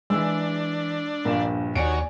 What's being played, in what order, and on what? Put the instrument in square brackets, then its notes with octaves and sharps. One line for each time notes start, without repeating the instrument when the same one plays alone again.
[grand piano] E3 E6 [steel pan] G#3 [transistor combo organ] D4
[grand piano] A#1 G2 E7 [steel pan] A#3
[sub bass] D#2 [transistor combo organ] D#3 F#4 C#5 [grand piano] D5 G#5 D7